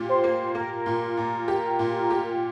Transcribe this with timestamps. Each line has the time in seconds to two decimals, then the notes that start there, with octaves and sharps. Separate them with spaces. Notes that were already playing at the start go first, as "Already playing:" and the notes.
Already playing: A#2 G4
0.09 C5
0.24 A#3
0.55 A#3 A#4
0.86 A#2
1.17 A#2
1.48 G4
1.79 A#2
2.10 G4